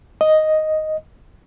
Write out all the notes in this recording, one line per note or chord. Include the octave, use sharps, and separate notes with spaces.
D#5